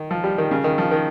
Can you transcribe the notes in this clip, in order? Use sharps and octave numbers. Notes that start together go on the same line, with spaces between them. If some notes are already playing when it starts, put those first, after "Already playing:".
Already playing: D#3
F3
G3
D#3
C#3
D#3
F3
D#3